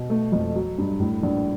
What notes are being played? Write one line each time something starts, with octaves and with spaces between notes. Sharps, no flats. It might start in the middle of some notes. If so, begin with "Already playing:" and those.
Already playing: B2
A3
F2
F#3
G2
A2
A#1